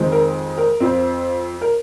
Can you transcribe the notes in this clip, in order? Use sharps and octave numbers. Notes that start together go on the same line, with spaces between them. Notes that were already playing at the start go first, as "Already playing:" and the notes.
Already playing: F2 D#3 G#3 C4
A#4
A#4
F2 F3 C4
A#4